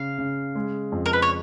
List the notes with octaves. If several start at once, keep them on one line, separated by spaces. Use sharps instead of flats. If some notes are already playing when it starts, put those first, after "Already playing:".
Already playing: C#3 F5
C#3
G#3
F2
A#4
B4
C#5